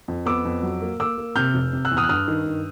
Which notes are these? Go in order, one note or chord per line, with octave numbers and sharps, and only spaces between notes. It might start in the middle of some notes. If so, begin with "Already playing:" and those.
F2
B3 D6 E6
F2
F#3
A#3
A#3 D6 E6
A#3
C3 F6 G6
F1
C3
E6 F#6
E2
D#6 F6
F#6
G2 D#6 F6
D#3
G2